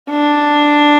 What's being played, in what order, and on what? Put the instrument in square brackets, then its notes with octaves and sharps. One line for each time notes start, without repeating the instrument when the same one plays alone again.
[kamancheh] D4